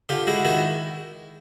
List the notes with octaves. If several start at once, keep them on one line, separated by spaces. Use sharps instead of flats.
D3 F4 G4
G#3 E4 F#4
D#3 E4 F#4